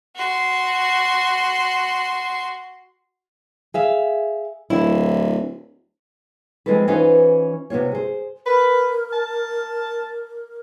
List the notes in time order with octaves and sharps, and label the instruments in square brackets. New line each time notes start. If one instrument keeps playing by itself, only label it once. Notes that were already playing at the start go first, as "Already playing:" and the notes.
[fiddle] F#4 C6
[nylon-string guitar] G#4 E5 F5
[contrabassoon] D1 [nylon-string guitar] E4
[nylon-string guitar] F3 G#3 C4 F4 A4 B4
E3 C#4 D#4 F4 B4 C5
C3 B3 F4 C#5
G#4 C5
[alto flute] A#4 [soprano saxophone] B4
[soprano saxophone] A5